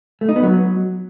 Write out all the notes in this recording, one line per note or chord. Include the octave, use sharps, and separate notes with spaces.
A3
D#4
B3
F#3